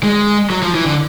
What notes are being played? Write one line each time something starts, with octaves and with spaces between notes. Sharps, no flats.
G#3
F#3
F3
E3
D3